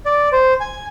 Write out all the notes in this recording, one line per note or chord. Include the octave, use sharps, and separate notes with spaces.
D5
C5
G#5